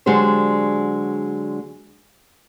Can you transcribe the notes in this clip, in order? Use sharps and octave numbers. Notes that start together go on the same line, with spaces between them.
D3 F#3 G#3 D4 G4 C5